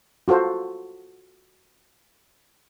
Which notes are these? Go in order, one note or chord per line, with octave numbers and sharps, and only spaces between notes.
F4 F#4 A4 C5